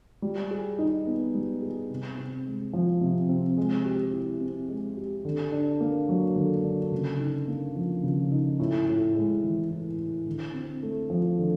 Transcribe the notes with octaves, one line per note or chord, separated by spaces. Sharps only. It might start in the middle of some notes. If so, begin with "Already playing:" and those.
G3
G#4
D#4
B3
G3
G#4
C3
C4
G#3
F3
C3
C4
G#3
G4
E4
C4
G#3
G4
D3
D4
A#3
F#3
D3
D4
C#3
D#4
A#3
F3
C#3
D#4
A2
A2
G#3
E3
A2
A2
D3
C4
A3
F3
D3